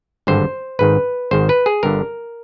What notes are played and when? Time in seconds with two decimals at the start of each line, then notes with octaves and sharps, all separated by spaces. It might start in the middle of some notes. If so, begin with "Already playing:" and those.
0.27 G#1 G2 D3 C5
0.79 G#1 G#2 D#3 B4
1.31 G#1 G#2 D#3 C5
1.49 B4
1.66 G#4
1.83 G1 G2 D3 A#4